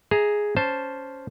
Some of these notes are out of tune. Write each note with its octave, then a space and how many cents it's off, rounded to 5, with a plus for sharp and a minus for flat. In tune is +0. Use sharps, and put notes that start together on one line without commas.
G#4 +0 E5 -15 A#5 +0
C#4 +10 C5 +0 A5 +0